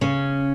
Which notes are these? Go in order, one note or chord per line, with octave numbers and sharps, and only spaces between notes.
C#3 C#4